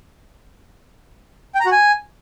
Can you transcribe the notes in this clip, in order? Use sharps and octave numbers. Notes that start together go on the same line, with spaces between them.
G5
A#5
F#4
G#5